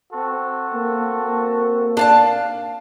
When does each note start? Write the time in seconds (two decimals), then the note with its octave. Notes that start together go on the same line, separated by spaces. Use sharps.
0.13 C4 F#4 A4
0.74 A#3
1.20 A#3
1.97 D4 F5 A5